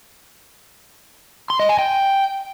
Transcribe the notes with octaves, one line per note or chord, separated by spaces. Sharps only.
C6
D#5
G#5
G5